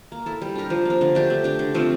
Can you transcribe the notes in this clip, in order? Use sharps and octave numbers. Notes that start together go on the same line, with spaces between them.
A#3
E4 A4
G3
D4 G4 A#4
F3
A#3 D4
D3
A3 D4 G4
A3
D4 G4
D3
F3 A3 C4